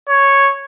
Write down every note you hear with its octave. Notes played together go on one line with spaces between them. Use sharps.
C#5